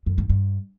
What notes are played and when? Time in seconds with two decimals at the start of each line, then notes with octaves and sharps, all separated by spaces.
0.06 F#2
0.18 G2
0.29 G2